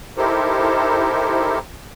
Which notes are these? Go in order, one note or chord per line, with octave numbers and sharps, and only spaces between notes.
D#4 E4 G4 A4 A#4 C5